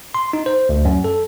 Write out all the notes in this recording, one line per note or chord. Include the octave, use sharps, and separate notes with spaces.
C6
D#4
C5
D2
F#2
A4